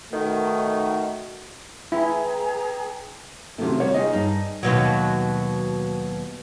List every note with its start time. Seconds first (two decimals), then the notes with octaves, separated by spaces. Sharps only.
0.13 B2 D#3 A3 D#4 F#4
1.92 E4 G#4 B4 G5 A#5
3.58 C3 D#3 F#3 A3 C#4 F4
3.80 C3 D#3 G3 C#5
3.94 A#3 D#4 F4 G#4 D#5
4.13 G2 D#4
4.63 D#2 B2 F#3